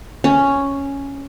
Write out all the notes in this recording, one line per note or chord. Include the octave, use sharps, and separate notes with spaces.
C#4